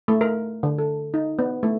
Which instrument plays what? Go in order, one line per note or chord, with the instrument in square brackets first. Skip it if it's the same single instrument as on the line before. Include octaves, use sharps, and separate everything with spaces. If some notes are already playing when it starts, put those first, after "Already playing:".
[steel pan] A3
A#4
D3
A4
D#4
B3
A3